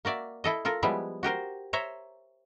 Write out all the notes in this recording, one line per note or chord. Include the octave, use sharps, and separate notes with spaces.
A#3 F#4 D5 E5
E4 A4 D#5
F4 A4 A#4
F3 G3 G#3 B3 E4
F#4 G4 A#4 C5
C5 C#5 E5 A#5